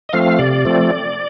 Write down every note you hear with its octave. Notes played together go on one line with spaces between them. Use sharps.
D#5
F3 A3 C4 F5
C3 D5
F3 A3 C4